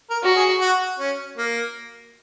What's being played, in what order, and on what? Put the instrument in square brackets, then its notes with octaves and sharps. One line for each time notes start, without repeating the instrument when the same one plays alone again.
[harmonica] A#4
[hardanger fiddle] F#4
[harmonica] G#4
F#4
C#4
A#3